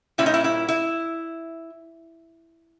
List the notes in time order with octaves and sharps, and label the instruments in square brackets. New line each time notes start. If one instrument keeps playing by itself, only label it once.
[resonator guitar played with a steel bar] A#2 G3 A#3 C#4 E4
D#4
E4
E4
E4